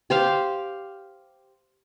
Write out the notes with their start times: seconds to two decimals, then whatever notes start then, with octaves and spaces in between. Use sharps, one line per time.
0.10 G4 C5 F5